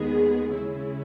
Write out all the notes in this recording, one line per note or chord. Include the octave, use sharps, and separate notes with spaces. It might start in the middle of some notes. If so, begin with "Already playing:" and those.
Already playing: D#2 D#3 G#3 B3 G#4
C#3 G#3 C#4 E4